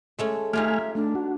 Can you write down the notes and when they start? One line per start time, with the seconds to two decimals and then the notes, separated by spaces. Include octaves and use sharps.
0.19 G#3 A3 C#4
0.53 A3 D#4 F4 G4 E5 G#5 F6
0.95 A3 D4
1.15 F#4